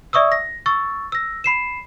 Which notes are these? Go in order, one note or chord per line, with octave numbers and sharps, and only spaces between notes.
D5 E5 C#6 D#6 E6
A#6
C#6 E6 A6
E6 A#6
B5 C7 E7